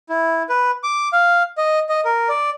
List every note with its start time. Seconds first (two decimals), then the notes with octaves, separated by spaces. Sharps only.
0.09 E4
0.49 B4
0.84 D6
1.13 F5
1.58 D#5
1.89 D#5
2.05 A#4
2.29 D5